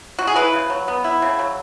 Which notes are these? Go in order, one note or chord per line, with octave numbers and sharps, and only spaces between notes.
F#4
G#4
E4 B4
C#3
F#3
B3
E4
C#3
F#3